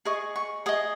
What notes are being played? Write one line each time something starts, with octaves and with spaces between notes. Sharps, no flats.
G#4 D#5 C#6
C#6
G#4 D#5 D#6